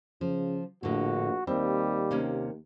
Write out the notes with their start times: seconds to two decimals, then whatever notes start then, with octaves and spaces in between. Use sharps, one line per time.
0.21 C#3 F3
0.83 A#1 A2 D3 F#4
1.47 D#2 G3 C4
2.11 C3 A#3 C#4